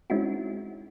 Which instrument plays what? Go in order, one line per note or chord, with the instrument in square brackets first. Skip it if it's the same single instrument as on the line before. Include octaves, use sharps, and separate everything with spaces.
[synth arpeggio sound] G#3 C4 C#4 D#4 E4 F#4